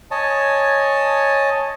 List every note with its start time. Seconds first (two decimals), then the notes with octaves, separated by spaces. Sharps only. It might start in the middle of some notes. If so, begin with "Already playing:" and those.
0.11 C#5 D#5 G#5 A5